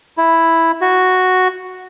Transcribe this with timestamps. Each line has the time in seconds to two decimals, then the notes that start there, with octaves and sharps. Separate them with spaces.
0.18 E4
0.81 F#4